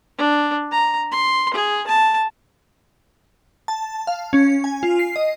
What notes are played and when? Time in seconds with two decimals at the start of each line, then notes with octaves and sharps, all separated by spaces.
0.18 D4
0.71 A#5
1.12 C6
1.54 G#4
1.87 A5
3.68 A5
4.07 F5
4.33 C#4
4.64 G#5
4.83 F4
4.99 C7
5.16 D#5